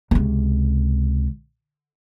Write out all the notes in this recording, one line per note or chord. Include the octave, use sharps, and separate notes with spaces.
C#2 C3